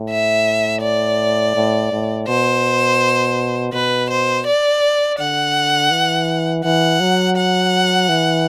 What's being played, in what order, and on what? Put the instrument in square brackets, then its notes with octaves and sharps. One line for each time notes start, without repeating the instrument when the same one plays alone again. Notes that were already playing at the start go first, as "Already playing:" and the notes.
Already playing: [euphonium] A2
[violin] E5
D5
[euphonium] A2
A2
[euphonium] B2 [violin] C5
[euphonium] B2 [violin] B4
[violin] C5
D5
[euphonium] D3 [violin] F#5
[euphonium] E3
[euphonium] E3 [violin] F#5
[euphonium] F#3
[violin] F#5
[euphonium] E3